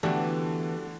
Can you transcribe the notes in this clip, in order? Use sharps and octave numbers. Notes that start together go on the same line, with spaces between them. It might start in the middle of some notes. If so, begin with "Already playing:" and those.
D3 E3 A3 B3 D4 F#4 G4 A4